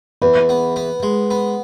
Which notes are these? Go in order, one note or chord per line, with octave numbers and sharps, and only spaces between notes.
E2 B4
B3
B3
G#3
B3